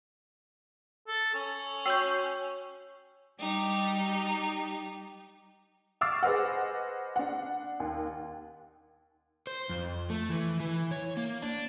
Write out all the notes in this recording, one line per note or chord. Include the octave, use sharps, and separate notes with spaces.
A4
C#4
F#4 C#5 G5 C#6 E6 G6
G3 D#4 G4
C#6 D6 E6 F6 A6 C7
G#4 B4 C5 D#5 F#5
D4 F#5
D#2
C5
F2
A3
E3
E3
C#5
A#3
D4